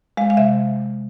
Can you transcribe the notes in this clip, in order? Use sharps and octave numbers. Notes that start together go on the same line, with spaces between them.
G#3 F5
F5
C3 E5